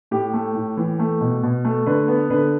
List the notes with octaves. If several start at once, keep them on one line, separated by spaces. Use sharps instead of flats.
A2 G4
A3
A2
E3
A3
B2
B2
A3
D3 B4
B3
D3 B4